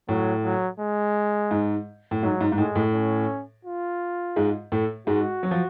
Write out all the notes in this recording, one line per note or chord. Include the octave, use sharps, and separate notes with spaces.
A2 F#3
F#3
G#3
G#2
A2
G#2 F#3
G#2
G#2
A2 G#3
A2
C#4
F4
G#2 G#3
A2 A3
G#2 G#3 F#4
F#3
F3